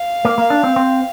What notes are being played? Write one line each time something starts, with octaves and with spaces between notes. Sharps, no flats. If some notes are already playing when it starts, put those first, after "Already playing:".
Already playing: F5
A#3
A#3
D4
C4
C4